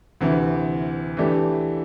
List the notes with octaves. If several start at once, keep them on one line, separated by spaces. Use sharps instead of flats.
D2 C3 E3
E3 A3 D4 G4